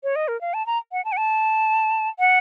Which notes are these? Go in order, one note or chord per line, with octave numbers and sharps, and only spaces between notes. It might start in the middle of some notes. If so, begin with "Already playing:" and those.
C#5
D#5
A#4
F5
A5
A#5
F#5
A5
F#5
A5
F#5